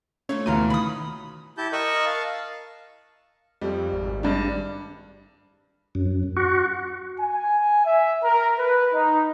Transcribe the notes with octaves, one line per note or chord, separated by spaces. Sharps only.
A3 A#3 C#4 F4 C#5
D2 B2 E3 F5 A#5 C6 D#7
D#3 F4 B5 D#6
E4 G4 A5 G6
A#4 D#5 C#6 E6 F#6
F5 A5
F2 G3
G#1
G2 D4
F#2
F#4
G#5
E5
A#4
B4
D#4